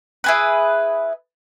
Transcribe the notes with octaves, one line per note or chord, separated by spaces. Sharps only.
E4 G#4 B4